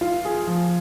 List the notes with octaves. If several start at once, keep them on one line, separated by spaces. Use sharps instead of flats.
F4
G#4
F3